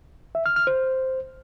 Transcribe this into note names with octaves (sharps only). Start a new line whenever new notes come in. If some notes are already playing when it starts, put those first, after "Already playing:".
E5
F6
F6
C5